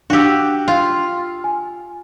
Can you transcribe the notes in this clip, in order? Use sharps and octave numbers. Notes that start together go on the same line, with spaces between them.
D4 F#4 G4 F5 E6
F4
G#5